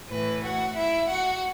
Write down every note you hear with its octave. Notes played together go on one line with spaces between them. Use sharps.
A2 E3 B4
F#4 F#5
E4 E5
F#4 F#5